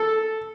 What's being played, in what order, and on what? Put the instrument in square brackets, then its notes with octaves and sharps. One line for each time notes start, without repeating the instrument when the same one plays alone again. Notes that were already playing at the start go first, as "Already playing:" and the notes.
Already playing: [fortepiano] A4